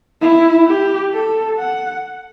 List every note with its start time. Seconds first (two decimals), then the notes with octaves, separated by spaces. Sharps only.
0.21 E4
0.67 G4
1.13 A4
1.58 F#5